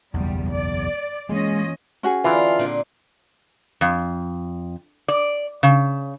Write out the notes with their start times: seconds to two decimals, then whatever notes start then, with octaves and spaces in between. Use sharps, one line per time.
0.14 F#1 B1 E2 G3
0.51 D5
1.29 E3 G#3 A#3 C#4 F4 D#5
2.03 C#4 F#4 G#4
2.24 D3 E3 F4 A4 A#4
2.59 A#2 D3 C4
3.81 F2
5.08 D5
5.63 C#3